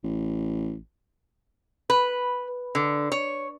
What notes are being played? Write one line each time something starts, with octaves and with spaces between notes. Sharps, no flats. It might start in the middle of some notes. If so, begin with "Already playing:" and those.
A1
B4
D3
C#5